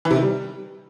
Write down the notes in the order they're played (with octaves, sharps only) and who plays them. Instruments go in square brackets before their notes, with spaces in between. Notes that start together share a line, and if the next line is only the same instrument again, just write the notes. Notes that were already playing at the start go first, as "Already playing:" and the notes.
[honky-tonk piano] E3
C3
D#3
G3